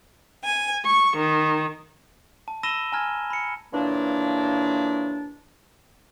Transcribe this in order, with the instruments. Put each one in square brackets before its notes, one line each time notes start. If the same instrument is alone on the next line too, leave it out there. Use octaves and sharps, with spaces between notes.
[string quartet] G#5
C#6
D#3
[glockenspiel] A5
B5 E6 A#6 D#7 E7 G7
G#5 A#5 F6 G#6
B5 C#7
[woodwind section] A#2 C#3 E3 A#3 D4